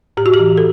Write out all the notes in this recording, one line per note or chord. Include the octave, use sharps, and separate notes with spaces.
A2 G4
F#4
G4
E3
A4